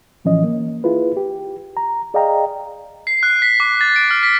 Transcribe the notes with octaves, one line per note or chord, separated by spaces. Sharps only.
A2 E3 F3 C#4 D#5
A#3
E4 F4 G#4 B4
G4
A#5
G#4 D5 D#5 F5 G5 A#5
C7
F#6
B6
D6
A6
D7
F6
B6